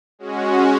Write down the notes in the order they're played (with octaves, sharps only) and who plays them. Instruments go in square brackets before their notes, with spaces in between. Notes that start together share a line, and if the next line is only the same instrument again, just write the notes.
[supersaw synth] G#3 C#4 F#4